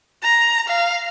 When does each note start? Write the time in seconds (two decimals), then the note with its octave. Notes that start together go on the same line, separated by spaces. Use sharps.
0.23 A#5
0.68 F5